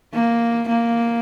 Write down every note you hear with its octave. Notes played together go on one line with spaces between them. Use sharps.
A#3
A#3